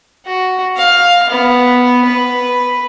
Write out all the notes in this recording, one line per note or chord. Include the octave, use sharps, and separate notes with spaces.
F#4
F5
B3
B4